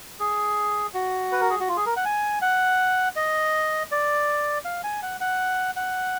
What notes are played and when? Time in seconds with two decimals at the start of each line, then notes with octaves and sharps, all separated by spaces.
0.20 G#4
0.94 F#4
1.32 B4
1.41 A#4
1.50 G#4
1.60 F#4
1.69 F4
1.77 G#4
1.86 A#4
1.96 F#5
2.05 G#5
2.42 F#5
3.16 D#5
3.92 D5
4.65 F5
4.84 G#5
5.02 F#5
5.21 F#5
5.76 F#5